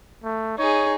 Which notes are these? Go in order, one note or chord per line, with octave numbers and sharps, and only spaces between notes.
A3
D#4 G#4 C#5